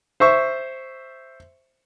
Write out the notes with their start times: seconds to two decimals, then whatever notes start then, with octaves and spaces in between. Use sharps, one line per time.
0.20 C5 E5 C#6